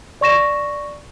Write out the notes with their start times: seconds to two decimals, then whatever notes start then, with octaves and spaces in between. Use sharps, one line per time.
0.21 D5 C#6 A#6 E7